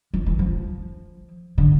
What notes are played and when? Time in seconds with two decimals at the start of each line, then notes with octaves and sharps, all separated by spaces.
0.14 F3
0.26 E3
0.39 F3
1.58 D3